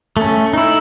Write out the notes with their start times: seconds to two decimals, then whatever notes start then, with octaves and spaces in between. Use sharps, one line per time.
0.17 A3 C#4
0.54 D#4 E4